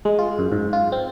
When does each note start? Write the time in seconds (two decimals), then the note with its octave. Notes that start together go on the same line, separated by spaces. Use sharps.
0.05 G#3
0.19 F4
0.39 F#2
0.52 G#2
0.73 F4
0.92 C4